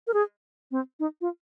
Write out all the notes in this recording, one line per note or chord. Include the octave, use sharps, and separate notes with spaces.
A#4
G#4
C4
D#4
F4